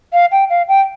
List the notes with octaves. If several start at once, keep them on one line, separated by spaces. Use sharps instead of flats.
F5
G5
F5
G5